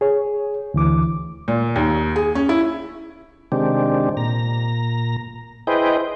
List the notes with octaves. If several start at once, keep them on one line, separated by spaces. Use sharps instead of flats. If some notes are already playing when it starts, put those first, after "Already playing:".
G#4 C#5
D2 E3 D6
A#2
D#2
G#4
C#4
E4
C3 D#3 G#3 C4 D4 G4
A#2 A#5
E4 G#4 B4 C5 D#5 G5